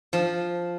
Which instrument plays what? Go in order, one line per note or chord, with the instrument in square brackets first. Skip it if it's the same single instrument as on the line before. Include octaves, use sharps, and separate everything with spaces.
[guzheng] F3